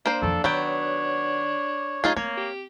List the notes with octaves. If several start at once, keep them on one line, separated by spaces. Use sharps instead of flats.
A#3 D4 C5
F2 D#3 A4
D#3 F#3 B3 C#5 G5
A3 D#4 F4 G#4
A#3 C4 C#5
G4